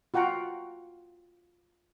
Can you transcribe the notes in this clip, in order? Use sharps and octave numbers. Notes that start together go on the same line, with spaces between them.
F4 F#4 F#5 G5 A#5